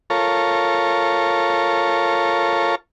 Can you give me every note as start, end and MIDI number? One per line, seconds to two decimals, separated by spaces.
0.10 2.75 65
0.10 2.75 69
0.10 2.75 70
0.10 2.75 73